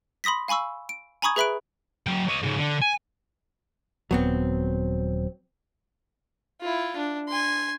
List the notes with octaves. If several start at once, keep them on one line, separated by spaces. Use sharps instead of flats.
B5 C6 D#6 A#6 B6
F5 G#5 B5 C#6 E6
D7
G#5 A#5 B5 C#6 D#6 G#6
G#4 B4 E5 B5 F#6 D7
F#3 G5
C#5 D#5
G#2 C#3
D3
G#5
D#1 F#3 B3 C4
E4 F4
D4
G#5 C6